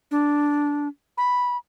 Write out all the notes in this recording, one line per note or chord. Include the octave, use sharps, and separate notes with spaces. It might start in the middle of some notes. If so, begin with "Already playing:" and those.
D4
B5